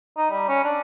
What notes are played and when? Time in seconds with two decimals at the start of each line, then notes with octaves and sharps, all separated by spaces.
0.18 D#4
0.30 G3
0.49 C#4
0.64 D4